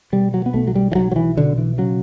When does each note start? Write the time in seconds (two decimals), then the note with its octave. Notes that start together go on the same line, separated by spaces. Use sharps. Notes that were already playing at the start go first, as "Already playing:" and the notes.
0.12 B2 G3
0.34 F#3
0.46 B3
0.54 B1 A3
0.68 F#3
0.75 G3
0.92 E3
0.95 B1 F#3
1.11 F#3
1.16 E3
1.37 B2 D3
1.58 E3
1.78 C#3 F#3